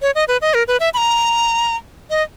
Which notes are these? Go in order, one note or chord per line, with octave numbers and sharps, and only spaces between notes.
C#5
D#5
B4
D#5
A#4
B4
E5
B5
A#5
D#5